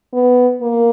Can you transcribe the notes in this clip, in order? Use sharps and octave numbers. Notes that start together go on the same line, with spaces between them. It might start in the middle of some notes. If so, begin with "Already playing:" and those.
B3
A#3